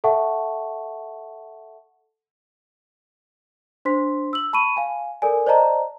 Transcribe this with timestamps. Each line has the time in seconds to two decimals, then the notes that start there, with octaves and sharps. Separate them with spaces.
0.04 A4 E5 F#5 A5 C#6
3.85 D4 C5 C6 B6
4.33 E6 F#7
4.53 A5 B5 C#6 D#7
4.77 F5 G#5
5.22 A4 A#4 D5 G#5
5.46 C5 D5 D#5 A5 A#5